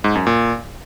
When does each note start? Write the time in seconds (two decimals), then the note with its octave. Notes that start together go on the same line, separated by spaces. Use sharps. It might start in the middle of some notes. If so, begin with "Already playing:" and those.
0.04 G#2
0.15 F#2
0.27 A#2